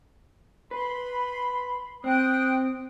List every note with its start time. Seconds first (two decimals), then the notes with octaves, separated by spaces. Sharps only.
0.71 B4 B5 C6
2.04 C4 G5 D#6 F#6